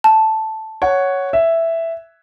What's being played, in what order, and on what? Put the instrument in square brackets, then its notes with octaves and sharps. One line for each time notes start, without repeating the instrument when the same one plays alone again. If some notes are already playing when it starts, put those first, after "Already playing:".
[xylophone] A5
[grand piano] C#5 F#5
E5